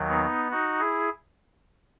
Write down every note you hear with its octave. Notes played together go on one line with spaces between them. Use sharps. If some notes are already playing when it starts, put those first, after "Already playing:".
Already playing: D#2 D#3 F#3
B3 D#4
D#4 F#4
E4 G#4